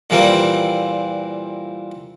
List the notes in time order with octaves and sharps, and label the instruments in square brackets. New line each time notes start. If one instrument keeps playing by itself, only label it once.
[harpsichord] A#2 E3 G3 A#3 C4